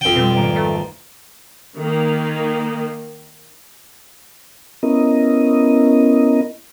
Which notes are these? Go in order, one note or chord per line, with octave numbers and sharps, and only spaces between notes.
F2 G5
B2 G3 C4
G#1 A#3 D7
A3
D#3 A#3
B3 C#4 E4 A#4 D#5